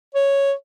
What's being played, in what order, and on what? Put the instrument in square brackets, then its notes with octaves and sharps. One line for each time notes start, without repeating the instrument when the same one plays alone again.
[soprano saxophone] C#5